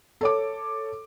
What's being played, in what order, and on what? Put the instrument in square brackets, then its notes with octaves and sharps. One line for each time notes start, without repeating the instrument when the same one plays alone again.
[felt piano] A4 C#5 D6